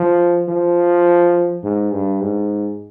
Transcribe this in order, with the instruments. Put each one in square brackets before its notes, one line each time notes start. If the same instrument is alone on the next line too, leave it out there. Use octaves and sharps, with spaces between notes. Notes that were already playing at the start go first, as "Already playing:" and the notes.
Already playing: [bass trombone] F3
F3
G#2
G2
G#2